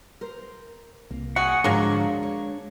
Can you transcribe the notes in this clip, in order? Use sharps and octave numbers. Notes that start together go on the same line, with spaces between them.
A#4 C5
C2 A#3
F#4 G#4 F#5
G#2 D3 F3 F#3 G#3 A#3 D4 C#6
C#5